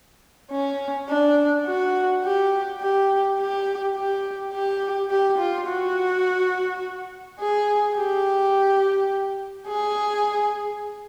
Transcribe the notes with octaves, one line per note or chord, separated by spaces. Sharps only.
C#4
D4
F#4
G4
G4
G4
G4
G4
G4
F4
F#4
G#4
G4
G#4